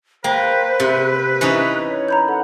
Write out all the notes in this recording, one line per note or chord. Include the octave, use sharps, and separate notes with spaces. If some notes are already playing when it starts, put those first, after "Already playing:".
A#3 B4 C5 G5
C3
E3 C#4 D#4
C#5
A#5 B5 G6
A4 F#5